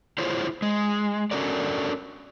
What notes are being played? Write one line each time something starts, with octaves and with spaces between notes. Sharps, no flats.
E4 F4 G#4 C5 C#5
G#3
C#4 D4 F#4 A4 A#4 D5